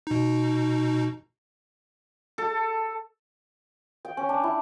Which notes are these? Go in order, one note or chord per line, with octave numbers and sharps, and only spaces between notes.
B2 D#4
A4
G5
C#4
D4
E4